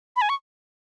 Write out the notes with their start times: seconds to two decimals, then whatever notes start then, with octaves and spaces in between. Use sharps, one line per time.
0.16 B5
0.22 G#5
0.29 C#6